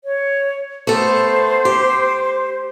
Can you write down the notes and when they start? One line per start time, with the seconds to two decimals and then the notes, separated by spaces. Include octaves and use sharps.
0.04 C#5
0.87 A3 B3 A4 C5
1.65 G4